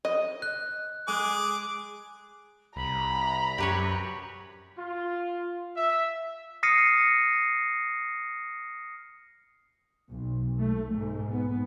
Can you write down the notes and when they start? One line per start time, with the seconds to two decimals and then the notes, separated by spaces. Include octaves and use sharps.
0.05 D#5
0.42 F#6
1.08 G#3 G#4 D6
2.76 C2 A#5 B5
3.58 F#2 G4 B4 C#5
4.77 F4
5.77 E5
6.63 D#6 F6 A#6 C7 C#7 D#7
10.08 B1
10.60 A3
10.95 G#2
11.33 B3